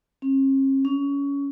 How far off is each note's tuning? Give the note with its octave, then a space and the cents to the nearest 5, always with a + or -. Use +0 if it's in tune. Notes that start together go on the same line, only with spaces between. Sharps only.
C#4 -45
C#4 +20